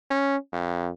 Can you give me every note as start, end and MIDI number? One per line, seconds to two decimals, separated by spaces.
0.10 0.37 61
0.53 0.90 41